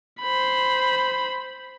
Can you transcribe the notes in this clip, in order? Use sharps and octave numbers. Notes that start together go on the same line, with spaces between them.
C5 B5